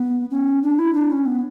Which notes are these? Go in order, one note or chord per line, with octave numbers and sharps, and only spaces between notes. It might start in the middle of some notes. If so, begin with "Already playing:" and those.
Already playing: B3
C#4
D4
E4
D4
C#4
B3